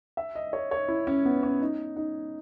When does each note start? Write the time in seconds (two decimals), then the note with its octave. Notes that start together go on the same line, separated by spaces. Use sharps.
0.17 E5
0.35 D#5
0.53 C#5
0.71 C#5
0.88 E4
1.07 C#4
1.25 B3
1.43 C#4
1.61 D#4
1.96 D#4